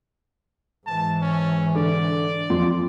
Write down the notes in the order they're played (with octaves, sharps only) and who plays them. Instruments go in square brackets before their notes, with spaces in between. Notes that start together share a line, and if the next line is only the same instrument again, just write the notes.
[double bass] G#2 E3 [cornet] A5
[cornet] C#4
[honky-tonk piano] D3 [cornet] D5
[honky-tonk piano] F2 F3 C6